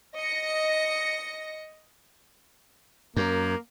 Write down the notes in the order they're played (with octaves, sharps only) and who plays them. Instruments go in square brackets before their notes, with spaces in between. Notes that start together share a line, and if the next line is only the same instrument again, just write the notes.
[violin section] D#5 A#6 C#7
[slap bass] F#2 [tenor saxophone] A#3